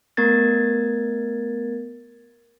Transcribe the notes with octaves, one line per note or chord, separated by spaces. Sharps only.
A3 B3 A#4 G#6 A6